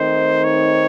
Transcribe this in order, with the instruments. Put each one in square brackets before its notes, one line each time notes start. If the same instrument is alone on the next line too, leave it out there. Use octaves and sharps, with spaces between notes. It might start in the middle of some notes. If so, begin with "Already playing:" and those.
Already playing: [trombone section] D#3 A3 C4 D#4 [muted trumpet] C5
[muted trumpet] C#5